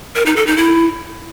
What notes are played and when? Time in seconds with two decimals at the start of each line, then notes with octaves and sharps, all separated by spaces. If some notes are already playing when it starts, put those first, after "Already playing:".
0.16 A#4
0.26 D#4
0.36 A4
0.47 D#4
0.57 E4